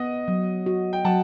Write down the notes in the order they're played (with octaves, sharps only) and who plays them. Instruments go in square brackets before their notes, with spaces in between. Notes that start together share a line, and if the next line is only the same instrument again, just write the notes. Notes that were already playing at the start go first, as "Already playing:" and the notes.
Already playing: [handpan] B3 [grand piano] D#5 F#5
[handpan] F#3
F#4
[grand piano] G5
[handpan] F#3 [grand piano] F#5 A5